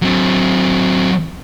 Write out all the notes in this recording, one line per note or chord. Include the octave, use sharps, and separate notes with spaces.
F#3 C4